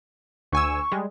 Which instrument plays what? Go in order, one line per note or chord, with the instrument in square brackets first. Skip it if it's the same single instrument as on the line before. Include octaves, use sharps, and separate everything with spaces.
[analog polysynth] D2 G#5 E6 [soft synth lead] C#6
[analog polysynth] G3 G#3